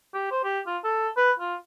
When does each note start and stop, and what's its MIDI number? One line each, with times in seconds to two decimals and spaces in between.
0.14 0.29 67
0.31 0.39 72
0.44 0.60 67
0.67 0.77 65
0.84 1.09 69
1.16 1.32 71
1.39 1.55 65